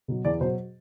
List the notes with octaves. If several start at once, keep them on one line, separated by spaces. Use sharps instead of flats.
B2 F#3
E2 D5
B2 F#3 C5